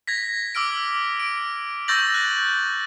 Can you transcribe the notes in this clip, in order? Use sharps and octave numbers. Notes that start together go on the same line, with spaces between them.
G#6 A#6 B6
D6 E6 F6 D7
D7
C#6 E6 G6 A6 A#6 F#7
F#6